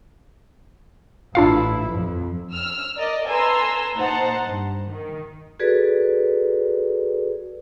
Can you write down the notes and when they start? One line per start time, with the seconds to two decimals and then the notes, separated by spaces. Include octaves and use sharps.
1.35 A1 D4 E4 F4 F5
1.89 F2
2.52 E6 F6
2.96 A#4 D5 D#5
3.27 A4 B4 G#5 A#5 C6 E6
3.95 A#2 D#4 C5 F#5 A5 A#5
4.44 G2
4.89 D#3
5.59 F#4 G#4 A4 B4 D5